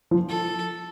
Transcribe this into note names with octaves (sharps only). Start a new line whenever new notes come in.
F3
A4